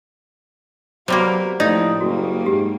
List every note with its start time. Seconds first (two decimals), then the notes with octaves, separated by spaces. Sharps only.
1.08 C3 F#3 G3 A#3 B3 F#4 A#4
1.60 A2 F3 A#3 C4 D#4 D5 D#5
2.01 F#1 F#3 G3 A#3 F#4
2.46 G#2 G4